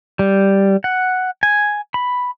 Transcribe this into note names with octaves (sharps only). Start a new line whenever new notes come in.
G3
F#5
G#5
B5